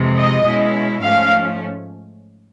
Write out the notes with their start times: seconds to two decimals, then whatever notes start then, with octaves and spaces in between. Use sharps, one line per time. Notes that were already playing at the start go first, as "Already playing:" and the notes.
Already playing: F2 C3 E3 G#3
0.17 D#5
0.45 B2 G#3 C#4 E4
1.02 G#2 F3 A3 C#4 F5